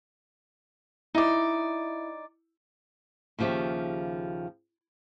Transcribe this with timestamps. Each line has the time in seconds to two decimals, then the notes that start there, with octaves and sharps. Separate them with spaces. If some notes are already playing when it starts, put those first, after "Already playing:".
1.15 D#4 E4 D5
3.39 D#2 C#3 F3 G4 E5